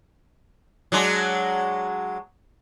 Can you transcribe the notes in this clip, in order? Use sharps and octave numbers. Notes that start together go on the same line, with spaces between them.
F#3 G#3 D4